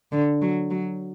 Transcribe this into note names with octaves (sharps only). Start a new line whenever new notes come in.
D3
F#3
F#3